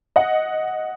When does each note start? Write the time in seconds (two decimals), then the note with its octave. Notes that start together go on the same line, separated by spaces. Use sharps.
0.16 D#5 F#5